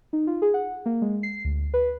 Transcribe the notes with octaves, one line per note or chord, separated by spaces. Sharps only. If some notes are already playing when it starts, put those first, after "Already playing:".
D#4
F4
G#4
F#5
A#3
G#3
C7
D2
B4